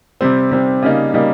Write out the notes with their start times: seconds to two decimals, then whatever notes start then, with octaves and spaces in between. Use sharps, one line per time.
0.21 C3 G3 C4
0.51 C3 G3 C4
0.82 C#3 G3 A#3 D#4
1.14 C#3 G3 A#3 D#4